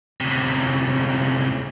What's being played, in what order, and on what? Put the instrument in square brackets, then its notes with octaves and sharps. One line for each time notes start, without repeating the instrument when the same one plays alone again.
[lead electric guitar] D2 C3